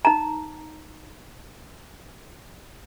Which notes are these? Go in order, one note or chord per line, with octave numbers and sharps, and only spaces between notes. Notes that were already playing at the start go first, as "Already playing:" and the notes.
D#4 A#5